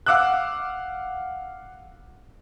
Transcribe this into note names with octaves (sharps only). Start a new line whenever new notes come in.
F5 F#5 D6 E6 F#6